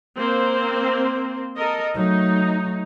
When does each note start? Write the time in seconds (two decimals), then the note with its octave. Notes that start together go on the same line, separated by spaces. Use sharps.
0.16 A#3 C4 C5
1.56 A4 A#4 D#5
1.95 F#3 A3 D#4